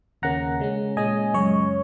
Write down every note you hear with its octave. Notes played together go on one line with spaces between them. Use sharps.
D#2 C#3 A#3 C#4 F#5 A#5
C#3 G#3 C#4
A#2 G#3 C#4 D#5 G#5
F#2 C#3 G#3 C#5